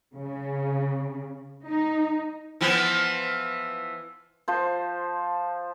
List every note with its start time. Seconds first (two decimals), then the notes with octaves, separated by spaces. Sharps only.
0.14 C#3
1.67 D#4
2.61 E3 F3 B3
4.48 F3 C5